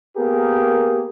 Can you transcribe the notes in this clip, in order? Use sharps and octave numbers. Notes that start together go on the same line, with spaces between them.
A#3 B3 G4 G#4 A#4